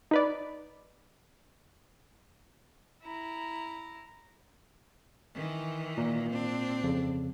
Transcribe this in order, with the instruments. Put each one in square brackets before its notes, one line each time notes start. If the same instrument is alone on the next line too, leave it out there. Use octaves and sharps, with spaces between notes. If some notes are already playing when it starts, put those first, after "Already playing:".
[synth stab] D#4 B4 D5
[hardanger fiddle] E4 A#5
[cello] D#3 E3
[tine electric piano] A#2
[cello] C4 D4
[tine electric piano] F2 C#3